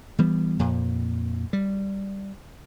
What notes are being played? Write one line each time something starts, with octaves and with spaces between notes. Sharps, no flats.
E3 G3 B3
F2 A#2
G3